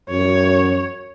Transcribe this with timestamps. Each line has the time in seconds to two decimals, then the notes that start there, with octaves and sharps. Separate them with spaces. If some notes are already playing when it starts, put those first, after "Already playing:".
0.10 F#2 C#5